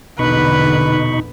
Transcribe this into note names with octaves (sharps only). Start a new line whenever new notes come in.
A#1 E2 B2 D3 D#4 B4 B5 C#6